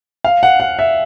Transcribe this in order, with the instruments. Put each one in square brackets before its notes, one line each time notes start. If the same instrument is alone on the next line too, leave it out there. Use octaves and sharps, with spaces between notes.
[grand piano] F5
F#5
F#5
E5